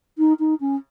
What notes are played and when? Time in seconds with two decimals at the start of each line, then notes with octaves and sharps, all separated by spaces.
0.18 D#4
0.39 D#4
0.60 C#4